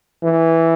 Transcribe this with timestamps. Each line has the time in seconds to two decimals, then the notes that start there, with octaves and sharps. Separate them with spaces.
0.23 E3